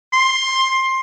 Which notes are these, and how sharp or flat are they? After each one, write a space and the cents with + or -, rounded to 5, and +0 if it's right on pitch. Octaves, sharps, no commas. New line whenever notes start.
C6 +15